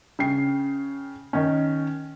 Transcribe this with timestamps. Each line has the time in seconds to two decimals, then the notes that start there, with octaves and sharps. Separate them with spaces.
0.19 C#3 G5 C7
1.33 D#3 C#4